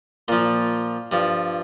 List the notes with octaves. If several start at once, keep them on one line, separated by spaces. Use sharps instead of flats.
A#2 F3 C6
G2 F3